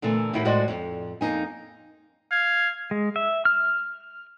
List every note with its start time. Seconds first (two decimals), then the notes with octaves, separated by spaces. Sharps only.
0.02 A#2 D3 E3 A3
0.33 D#2 A2 E4 F#4
0.45 A2 G#3 F#4 C5 D5 D#5
0.68 F2
1.21 F2 A#3 D#4 G#5
2.31 F5 G#6
2.91 G#3
3.16 E5
3.45 F6